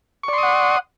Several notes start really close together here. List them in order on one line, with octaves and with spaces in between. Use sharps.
C#6 D5 C6 D#6 F#5